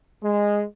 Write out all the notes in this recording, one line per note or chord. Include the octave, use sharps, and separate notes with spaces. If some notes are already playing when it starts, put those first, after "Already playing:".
G#3